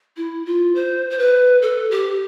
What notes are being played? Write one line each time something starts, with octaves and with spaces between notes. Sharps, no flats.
E4
F4
C5
C5
B4
A4
G4